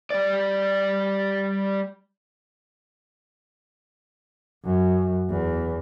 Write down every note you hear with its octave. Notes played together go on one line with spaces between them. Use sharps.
G3 D5
F#2
E2